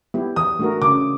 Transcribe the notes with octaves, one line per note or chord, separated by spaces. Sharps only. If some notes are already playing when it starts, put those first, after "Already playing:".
B3 E4 G4
E3 D#6
A3 D4 F#4 A#4
C#3 D6